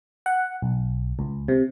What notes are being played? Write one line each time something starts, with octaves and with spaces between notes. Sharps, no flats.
F#5
B1
C#2
C3